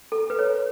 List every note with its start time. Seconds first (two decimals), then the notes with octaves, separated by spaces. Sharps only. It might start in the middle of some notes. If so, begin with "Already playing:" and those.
0.12 A4
0.30 B4
0.39 C#5